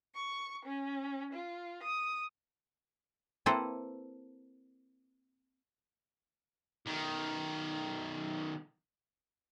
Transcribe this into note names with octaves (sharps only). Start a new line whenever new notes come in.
C#6
C#4
F4
D#6
A#3 C4 E4 A4 B4 C5
B1 D#3